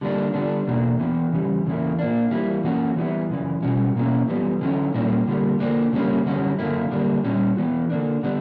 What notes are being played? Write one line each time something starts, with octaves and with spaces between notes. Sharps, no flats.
D3 G3 A#3 D4
D3 G3 B3 D4
E2 B2 A#3 D4 F#4
E3 B3 F#4
C#3 E3 G3
E2 C#3 E3 A#3 E4
A#2 A#3 D4
E3 G3 A#3 E4
F#2 E3 A#3 C#4 F#4
E3 G3 B3 E4
F#2 C#3 E3
B2 G3 C#4 F#4
B2 A#3 C#4 E4
F#2 E3 G3 B3
D3 F#3 C#4 E4
A#2 G3 A#3 C#4 E4
D3 G3 A#3
D3 A#3 D4
C#3 G3 A#3 C#4
F#2 D3 G3 C#4 F#4
F#2 D3 A#3 E4
D3 G3 A#3 D4
A#2 G3 C#4 E4
E3 B3 F#4
D3 A#3 D4
D3 G3 B3 D4